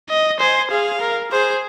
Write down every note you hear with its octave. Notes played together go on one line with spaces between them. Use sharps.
D#5
C5 G#5
G#4 F5
A#4
G#4 C5